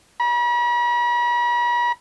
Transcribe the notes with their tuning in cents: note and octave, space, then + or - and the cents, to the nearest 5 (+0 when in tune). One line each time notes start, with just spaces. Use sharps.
B5 -45